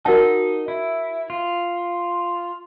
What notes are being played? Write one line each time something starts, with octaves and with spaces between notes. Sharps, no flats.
D#4 F#4 A#4 D#5 F#5 A5
E4
F4